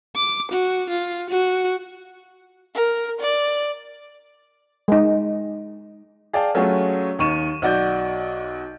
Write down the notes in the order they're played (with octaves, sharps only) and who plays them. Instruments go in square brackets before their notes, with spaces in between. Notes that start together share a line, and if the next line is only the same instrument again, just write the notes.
[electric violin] D6
F#4
F4
F#4
[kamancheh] A#4
D5
[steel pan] G#3 D#4
[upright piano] G#4 D5 F5 G5 A5
F#3 A3 C#4 F4 F#4 G#4
D#2 D#3 C#6 D#7 E7
B1 F#4 D5 G6